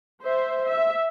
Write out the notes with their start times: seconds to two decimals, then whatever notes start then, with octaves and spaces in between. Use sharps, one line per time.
0.23 C5 E5
0.66 E5